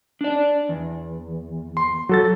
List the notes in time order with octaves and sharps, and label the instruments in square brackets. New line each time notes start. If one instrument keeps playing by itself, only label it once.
[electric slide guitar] D4 D5
E2
[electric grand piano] C6
F#3 A4 A6